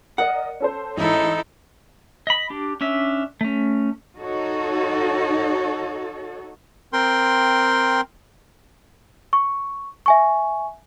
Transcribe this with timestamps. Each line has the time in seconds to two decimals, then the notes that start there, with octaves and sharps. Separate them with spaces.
0.18 A#4 D5 D#5 F#5
0.60 C#4 A4 C5
0.97 A1 G#2 D#4 E4 A4
2.27 D#5 B5
2.50 D4 G4
2.81 C#4 D4 E5
3.41 A3 C#4
4.17 D#4 F#4 A4 C#5
6.93 C4 A#4 G5 C6
9.33 C#6
10.06 E5 G#5 C#6